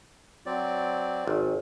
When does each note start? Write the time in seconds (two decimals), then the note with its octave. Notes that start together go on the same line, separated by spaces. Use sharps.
0.46 F#3 C4 D5
1.27 G#1